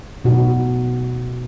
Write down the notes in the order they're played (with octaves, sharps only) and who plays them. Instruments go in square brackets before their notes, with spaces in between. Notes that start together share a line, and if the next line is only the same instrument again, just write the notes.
[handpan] B2 A3 D#4 F#4